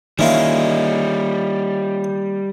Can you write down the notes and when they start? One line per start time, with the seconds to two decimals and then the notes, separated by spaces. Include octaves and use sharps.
0.19 D#3 G3 A#3 C#4 E4 F4 D#5